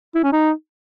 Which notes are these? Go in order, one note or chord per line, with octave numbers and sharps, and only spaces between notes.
E4
C#4
D#4